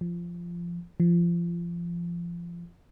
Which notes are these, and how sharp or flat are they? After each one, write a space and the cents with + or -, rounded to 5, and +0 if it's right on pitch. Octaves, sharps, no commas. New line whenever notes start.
F3 -15
F3 -25